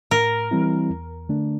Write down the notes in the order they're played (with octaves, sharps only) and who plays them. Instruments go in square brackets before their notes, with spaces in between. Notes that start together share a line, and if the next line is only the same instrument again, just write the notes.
[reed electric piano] A2 [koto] A#4
[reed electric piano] E3 G3 C4 E4
E2
D3 A3 D4